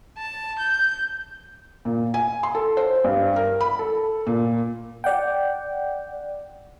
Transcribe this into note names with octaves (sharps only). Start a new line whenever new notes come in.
A5
G6
A#2
G#5
C6
A4
C5
G2
A#4
B5
A4
A#2
D5 F#5 G5